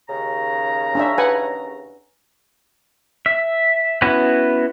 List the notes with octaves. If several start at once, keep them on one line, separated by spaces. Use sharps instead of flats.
D#2 C#3 A#5
C#4 D4 E5
B4 F#5 G#5
E5
B3 C#4 E4 F#4 B4